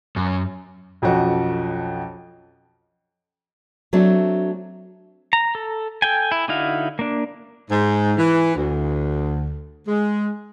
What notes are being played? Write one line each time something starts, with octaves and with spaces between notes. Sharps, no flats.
F#2
B1 F2 F3 C#4 F#4
F#3 A3 C4 D4
A#5
A4
A4 G5 G#5
E4
D3 D#4 E4 F#4 F5
A#3 D4
G#2
E3
D2
G#3